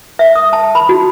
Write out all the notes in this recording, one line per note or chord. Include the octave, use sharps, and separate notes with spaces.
E5
D#6
A5
B5
F#4